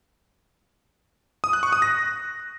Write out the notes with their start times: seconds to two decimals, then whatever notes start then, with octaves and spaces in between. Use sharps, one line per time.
1.44 D#6
1.53 F#6
1.63 C#6
1.73 D#6
1.82 A#6